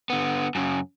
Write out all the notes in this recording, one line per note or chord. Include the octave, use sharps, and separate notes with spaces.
D3 B3
F#2 C#3